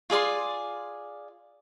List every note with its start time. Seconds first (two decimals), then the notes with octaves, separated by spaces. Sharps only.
0.10 F4 G#4 D5 C6